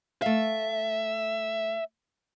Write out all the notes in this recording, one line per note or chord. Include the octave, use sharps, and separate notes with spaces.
A3 E5 F5